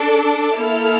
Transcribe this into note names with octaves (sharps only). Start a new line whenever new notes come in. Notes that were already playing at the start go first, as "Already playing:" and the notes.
Already playing: D4 A4 D6
A#3 E4 A4 F6